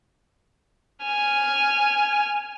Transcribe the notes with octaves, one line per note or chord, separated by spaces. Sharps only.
G#5 F6